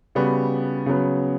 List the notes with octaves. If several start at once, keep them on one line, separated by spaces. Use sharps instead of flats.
C#3 G3 B3 F#4
C#3 F#3 B3